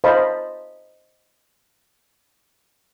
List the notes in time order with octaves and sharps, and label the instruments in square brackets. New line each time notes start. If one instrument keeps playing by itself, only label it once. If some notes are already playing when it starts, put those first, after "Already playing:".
[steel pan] C5 D#5 F5 A5 B5